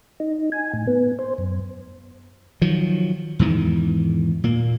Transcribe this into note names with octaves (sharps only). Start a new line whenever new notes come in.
D#4
G#5
A2
B3
C5
F#2
D#3 F3 F#3
E2 G#2 D#3 E3
A#2 A#3